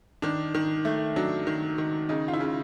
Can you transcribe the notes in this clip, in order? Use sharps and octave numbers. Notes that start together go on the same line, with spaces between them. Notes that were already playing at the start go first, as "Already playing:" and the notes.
D#3 D4
D#3
A3
F#3 D4
D#3
D#3
C#3 D#4
F4
E4
C#3